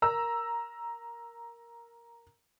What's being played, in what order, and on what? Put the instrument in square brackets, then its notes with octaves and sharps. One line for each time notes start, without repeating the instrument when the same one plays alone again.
[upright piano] A#4 A#5 E6